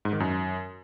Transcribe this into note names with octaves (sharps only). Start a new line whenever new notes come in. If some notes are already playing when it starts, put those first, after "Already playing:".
G#2
D#3
F#2